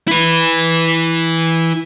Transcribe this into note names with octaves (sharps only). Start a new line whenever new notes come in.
E4 B4